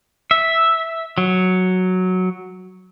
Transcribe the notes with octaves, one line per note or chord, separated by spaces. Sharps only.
E5
F#3